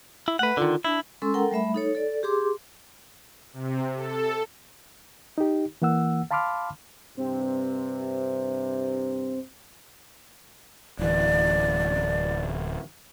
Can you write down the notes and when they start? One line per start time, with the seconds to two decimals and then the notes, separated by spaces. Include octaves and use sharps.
0.28 E4
0.39 A3 B4 F#5
0.57 D3 D#3 F4
0.85 D4 E4
1.22 G#3 C#4 A4 C6 E6
1.34 A4 A#4 F#5 G5 A#5
1.51 G3 A3 E5 B5
1.74 D#4 A4 C#5
1.95 A4 D5
2.23 G4 G#4 C6 D6
3.53 C3
3.96 A4
5.38 D#4 G4
5.82 E3 A#3 F#5 E6
6.31 F5 A5 B5 C6 D6 F6
7.17 G2 C3 C4
10.99 D1 E3 D5